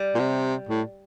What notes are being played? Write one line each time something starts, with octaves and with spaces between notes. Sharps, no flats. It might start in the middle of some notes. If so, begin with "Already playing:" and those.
Already playing: G3
A#2
C3
A2